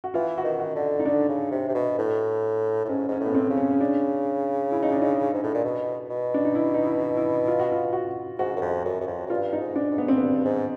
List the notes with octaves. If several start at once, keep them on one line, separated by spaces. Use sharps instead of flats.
F#4
E3 F4
F#4
D#3
F#4
D3
D#4
D3 D4
C#3
C3
C3
B2
A2
A2
G#2 C#4
G#2 C#4
A2
B3
C4
C#3
C#4
C#4
D4
E4
D#4
D4
D#4
G#2
A2
A#2
B2
B2
D4
D#4
E4
D#4
E4
E4
F4
F#4
F4
F#4
G#2 F#4
F#2
F2
F#2
F#2
F2
F#2
G2 F4
D#4
G#2
D4
G#2
B3
C4
G2 B3
G#2